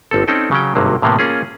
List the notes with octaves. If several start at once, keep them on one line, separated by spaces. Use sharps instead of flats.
G1 C4 A4
C4 C#4 D#4 A4 D5 G5
C#3 F#3 C#4 G5
G#1 G2 C3 F#3 A#3
A2 C3 E3 A#3 B3
A#3 C#4 F4 G#4